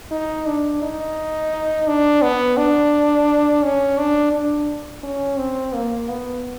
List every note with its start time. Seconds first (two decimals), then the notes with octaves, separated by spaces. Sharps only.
0.11 D#4
0.46 D4
0.82 D#4
1.87 D4
2.22 B3
2.57 D4
3.63 C#4
3.98 D4
4.33 D4
5.03 C#4
5.38 C4
5.74 A#3
6.09 B3